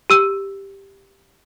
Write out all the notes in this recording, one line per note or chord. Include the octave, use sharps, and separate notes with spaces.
G4 E6 D#7